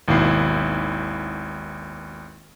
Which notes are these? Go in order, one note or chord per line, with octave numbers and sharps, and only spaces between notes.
G#1 D#2 B2 E4 C7